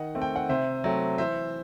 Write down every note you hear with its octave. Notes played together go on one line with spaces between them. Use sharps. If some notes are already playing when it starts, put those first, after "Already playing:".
Already playing: D#3 D#5 F#5
A3 C4
G5
F#5
C3 C5 E5
F#3 A3 C4
E3 C5 E5